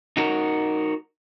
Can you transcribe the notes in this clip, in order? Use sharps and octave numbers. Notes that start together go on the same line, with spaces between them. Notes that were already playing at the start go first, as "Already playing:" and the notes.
D#4 F#4 A#4